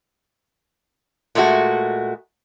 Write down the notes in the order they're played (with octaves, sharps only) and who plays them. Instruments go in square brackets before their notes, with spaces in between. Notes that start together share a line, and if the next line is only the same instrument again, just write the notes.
[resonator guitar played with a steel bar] A#2 G#3 A3 D#4 F#4